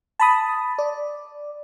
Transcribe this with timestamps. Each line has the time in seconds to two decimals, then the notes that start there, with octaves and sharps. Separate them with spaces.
0.20 A5 B5 D#6
0.78 D5